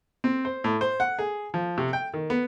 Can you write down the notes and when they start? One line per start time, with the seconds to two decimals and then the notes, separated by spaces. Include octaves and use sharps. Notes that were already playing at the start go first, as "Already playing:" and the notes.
0.24 C4
0.45 C5
0.64 A2
0.81 C5
1.00 F#5
1.19 G#4
1.54 F3
1.78 C3
1.93 G5
2.14 D#3
2.30 B3